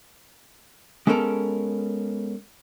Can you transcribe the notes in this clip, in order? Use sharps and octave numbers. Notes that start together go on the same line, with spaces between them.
G#3 B3 C#4 A4 A#4